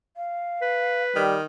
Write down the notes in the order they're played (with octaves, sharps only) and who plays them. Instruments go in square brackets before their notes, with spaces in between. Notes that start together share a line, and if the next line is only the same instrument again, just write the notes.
[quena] F5
[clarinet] B4
[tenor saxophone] D#3 [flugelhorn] G3